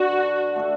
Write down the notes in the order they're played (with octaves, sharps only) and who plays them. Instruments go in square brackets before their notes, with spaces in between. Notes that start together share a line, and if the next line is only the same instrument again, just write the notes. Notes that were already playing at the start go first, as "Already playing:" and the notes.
Already playing: [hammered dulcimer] D4 B4 [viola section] F#4
[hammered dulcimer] D3
A3 D4 A4